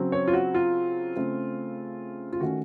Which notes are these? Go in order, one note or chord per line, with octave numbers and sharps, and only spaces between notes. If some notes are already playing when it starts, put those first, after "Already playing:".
Already playing: C#3 F#3 C4
C#5
F4
F#4
F4
C#3 A3 C4
F4
D#3 A3 C#4 F#4